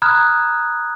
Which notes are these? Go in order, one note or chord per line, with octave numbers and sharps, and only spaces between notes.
A#5 B5 D#6 F6 F#6 G#6